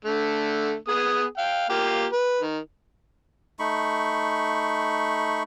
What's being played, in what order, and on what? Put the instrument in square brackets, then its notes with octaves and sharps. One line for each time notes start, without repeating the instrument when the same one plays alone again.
[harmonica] D3 A3
B3 G#4 D#6
F5 G5
A#3 F4 G4
B4
D#3
[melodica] A3 D#4 B5 C#6